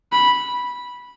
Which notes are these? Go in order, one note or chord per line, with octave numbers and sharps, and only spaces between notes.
B5